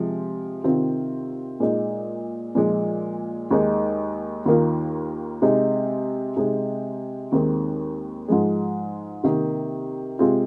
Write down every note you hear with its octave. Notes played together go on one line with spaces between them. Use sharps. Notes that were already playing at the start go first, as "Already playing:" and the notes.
Already playing: C3 F3 G#3
C3 D#3 C4 F4
A#2 G#3 D#4
A#2 F3 G#3 D#4
D#2 D#3 G#3 D#4
D#2 D#3 A#3 F4
C3 G#3 D#4
C3 G#3 D#4
D#2 D#3 G#3 C4
G#2 F3 G#3
C3 D#3 A#3
C3 G#3 C4 F4